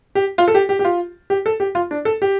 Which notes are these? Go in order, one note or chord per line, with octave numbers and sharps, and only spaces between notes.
G4
F4
A4
G4
G4
G4
F4
G4
A4
G4
F4
D4
A4
G4